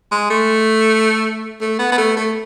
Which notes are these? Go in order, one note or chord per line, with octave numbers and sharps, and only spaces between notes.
G#3
A3
A3
B3
B3
A3
A3